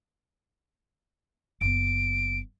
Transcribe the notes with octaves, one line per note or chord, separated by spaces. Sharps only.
F#1 B3 D7